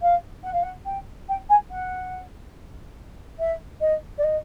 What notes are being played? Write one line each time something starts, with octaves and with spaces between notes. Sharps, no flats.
F5
F#5
F5
F#5
G5
G5
G#5
F#5
E5
D#5
D5
D#5